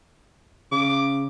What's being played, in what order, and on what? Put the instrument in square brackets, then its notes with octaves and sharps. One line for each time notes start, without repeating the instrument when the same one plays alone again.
[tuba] C#3 [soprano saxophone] D6